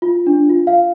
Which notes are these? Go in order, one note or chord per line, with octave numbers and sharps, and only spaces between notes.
F4
D4
F4
F5